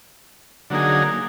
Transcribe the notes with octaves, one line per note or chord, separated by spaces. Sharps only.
D3 F#3 A#3 D#4 G#4